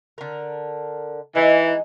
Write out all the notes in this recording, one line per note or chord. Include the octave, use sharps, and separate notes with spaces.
D3 A#4
E3 G#3 D#4